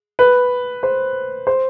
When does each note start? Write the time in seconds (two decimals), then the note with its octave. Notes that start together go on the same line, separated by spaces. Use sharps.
0.19 B4
0.83 C5
1.47 C5